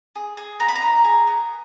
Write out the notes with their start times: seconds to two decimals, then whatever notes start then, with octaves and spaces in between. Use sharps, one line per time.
0.16 G#4
0.37 G#4
0.60 B3 A#5
0.68 B5
0.76 A#5
0.82 D#4
1.04 G#4
1.27 B3